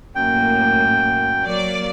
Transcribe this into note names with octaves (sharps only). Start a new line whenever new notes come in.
F#2 A2 A#3 G5
F#3 A#3 D5